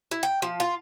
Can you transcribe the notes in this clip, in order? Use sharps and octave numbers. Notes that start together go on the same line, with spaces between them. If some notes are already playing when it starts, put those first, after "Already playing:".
E4
G5
F3
F4